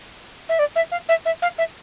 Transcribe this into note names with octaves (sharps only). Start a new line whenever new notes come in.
E5
D5
E5
F5
E5
E5
F5
E5